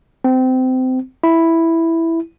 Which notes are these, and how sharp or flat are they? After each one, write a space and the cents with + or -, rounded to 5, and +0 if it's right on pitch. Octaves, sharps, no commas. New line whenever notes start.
C4 -25
E4 +0